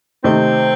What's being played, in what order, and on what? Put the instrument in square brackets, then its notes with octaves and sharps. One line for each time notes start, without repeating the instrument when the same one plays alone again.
[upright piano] C3 D#3 A3 D#4 [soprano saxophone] C4